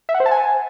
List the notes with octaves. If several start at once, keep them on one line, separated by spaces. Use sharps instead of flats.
E5
F#5
C5
A5
G#5